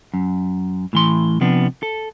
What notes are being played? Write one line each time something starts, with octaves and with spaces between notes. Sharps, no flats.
F#2
A2 E3 C6
C3 F3 B3 D4
A4